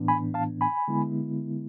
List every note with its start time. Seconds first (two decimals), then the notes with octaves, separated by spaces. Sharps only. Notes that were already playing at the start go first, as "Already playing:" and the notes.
Already playing: A2 E3 B3 D4
0.08 G#5 B5
0.34 F5 A5
0.61 G#5 B5
0.88 D3 G#3 B3 E4